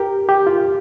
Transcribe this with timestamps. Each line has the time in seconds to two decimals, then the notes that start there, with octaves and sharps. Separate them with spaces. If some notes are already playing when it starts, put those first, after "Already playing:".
Already playing: G4 A#4
0.29 G4
0.47 F4